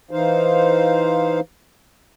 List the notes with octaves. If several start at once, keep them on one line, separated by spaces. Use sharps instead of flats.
E3 D#4 C5 F5